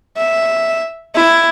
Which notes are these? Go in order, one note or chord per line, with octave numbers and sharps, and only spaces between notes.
E5
E4